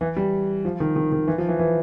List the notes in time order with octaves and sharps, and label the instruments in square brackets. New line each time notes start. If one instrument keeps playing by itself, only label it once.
[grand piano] E3
G3
F3
D#3
D#3
D#3
E3
F3
E3
E3